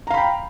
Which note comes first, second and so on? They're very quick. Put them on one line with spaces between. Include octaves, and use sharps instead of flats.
A#5 F5 B5 G5